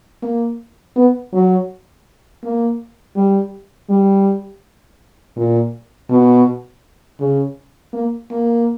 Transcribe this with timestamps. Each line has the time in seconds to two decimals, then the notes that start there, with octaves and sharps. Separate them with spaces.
0.23 A#3
0.96 B3
1.33 F#3
2.44 A#3
3.16 G3
3.90 G3
5.36 A#2
6.10 B2
7.20 C#3
7.93 A#3
8.31 A#3